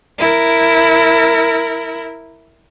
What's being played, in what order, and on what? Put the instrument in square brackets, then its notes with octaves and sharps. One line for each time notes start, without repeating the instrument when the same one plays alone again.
[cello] E4 A#4